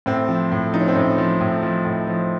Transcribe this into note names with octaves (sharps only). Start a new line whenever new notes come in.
A2 C4
F3
A2
F3 D#4
C#4
C4
A2 C#4
F3
A2
F3
A2
F3